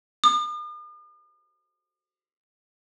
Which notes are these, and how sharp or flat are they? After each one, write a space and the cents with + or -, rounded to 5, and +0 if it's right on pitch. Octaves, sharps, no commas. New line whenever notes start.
D#6 -45